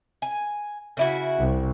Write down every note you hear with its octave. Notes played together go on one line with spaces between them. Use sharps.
G#5
C#3 E4 F#4
C2